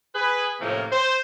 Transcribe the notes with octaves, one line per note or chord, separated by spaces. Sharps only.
G#4 B4
A2 C3 F3 A#3 C#4
C5